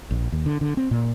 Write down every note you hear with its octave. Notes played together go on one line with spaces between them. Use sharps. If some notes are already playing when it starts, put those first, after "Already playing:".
A#1
D#2
D3
D3
C4
A#2